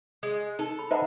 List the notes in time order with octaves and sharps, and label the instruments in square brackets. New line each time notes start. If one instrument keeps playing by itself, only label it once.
[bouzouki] G#3
[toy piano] D#4 [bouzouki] A4
[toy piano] B5
[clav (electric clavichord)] D#4 B4 E5 [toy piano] C5 F#5 A5